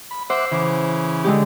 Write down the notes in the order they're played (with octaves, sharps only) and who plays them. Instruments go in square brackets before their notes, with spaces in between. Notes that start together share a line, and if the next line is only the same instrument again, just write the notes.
[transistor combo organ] B5
[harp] C5 [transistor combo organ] E5 F#5 D6
[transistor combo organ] C#3 E3
[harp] D3 G#3 G4